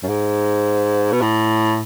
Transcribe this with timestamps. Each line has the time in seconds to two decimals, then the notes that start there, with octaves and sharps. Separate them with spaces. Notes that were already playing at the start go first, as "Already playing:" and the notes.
0.03 F#2
0.08 G#2
1.12 B2
1.21 A2